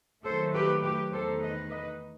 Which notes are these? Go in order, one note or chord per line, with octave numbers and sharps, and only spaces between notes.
D#3 F#3 A3 A4 C5
G4 B4
G4 B4
E2 D#3 A3 D#4 A4 C5
B4 D#5
B4 D#5